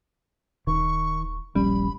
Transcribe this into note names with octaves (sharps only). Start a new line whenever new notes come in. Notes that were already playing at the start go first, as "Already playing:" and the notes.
D#1 D#3 C#6
D#1 A#1 G3 C#4 B5